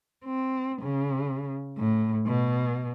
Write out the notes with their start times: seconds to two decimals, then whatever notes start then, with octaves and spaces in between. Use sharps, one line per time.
0.25 C4
0.82 C#3
1.78 A2
2.27 B2